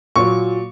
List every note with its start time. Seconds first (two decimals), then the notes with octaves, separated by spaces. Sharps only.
0.16 A#2 F#3 C#6